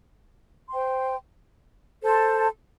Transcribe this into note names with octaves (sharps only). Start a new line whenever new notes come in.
C5 G5 C6
A4 C5 A5 C6